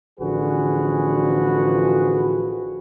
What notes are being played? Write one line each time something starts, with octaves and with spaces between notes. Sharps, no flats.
A1 D3 F3 F#4 G#4 B4